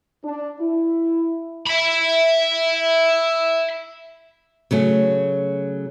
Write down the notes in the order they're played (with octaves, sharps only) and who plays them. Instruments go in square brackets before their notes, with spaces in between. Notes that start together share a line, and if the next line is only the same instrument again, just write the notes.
[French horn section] D4
E4
[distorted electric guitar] E5 B5
[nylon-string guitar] C#3 F#3 A3